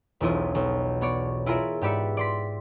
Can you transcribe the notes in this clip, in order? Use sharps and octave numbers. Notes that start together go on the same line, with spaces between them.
E1 B1 E4 F4 D#6
B1
B3 C#5 D5
E4 F4 G#4 A#4 E5
G#2 G4 B4 D5 E5 C#7
D5 C6 B6